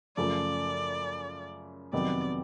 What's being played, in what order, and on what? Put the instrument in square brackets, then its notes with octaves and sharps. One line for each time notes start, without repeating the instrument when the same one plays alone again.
[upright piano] F#2 C#3 F3 A3 [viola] D5
[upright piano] F2 C3 D#3 F#3 B3 [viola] D5